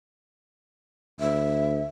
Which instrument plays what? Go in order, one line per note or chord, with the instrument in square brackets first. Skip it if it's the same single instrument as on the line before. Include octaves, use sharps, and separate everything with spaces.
[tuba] D2 [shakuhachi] E5